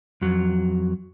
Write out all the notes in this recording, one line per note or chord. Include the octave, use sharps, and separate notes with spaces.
F2 F#3